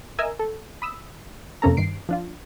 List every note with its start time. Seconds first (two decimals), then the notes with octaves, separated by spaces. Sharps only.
0.19 A#4 D#5 E5 G#5 E6
0.39 A4
0.82 B5 D#6 E6
1.62 F2 C3 A#3 C#4 A4 A#5
1.77 G2 D#3 C7 D7
2.09 F3 D4 F4